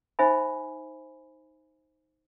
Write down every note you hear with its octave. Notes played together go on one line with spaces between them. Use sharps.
D#4 C5 E5 G#5 B5